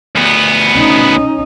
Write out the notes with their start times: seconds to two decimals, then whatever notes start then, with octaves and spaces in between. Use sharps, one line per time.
0.15 D2 B3
0.75 C#4 D#4